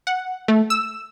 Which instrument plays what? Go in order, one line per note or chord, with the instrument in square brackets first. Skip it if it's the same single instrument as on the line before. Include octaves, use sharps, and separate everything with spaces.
[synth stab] F#5
A3
E6